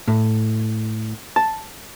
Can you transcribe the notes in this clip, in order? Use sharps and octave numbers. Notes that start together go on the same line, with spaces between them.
A2
A5